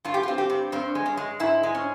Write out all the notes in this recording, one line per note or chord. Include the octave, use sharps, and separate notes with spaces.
G2 F4
G4
C4 F4
G4
G2
G2 C4
G#3
C#4
G#3
G#2 E4
G#3
C#4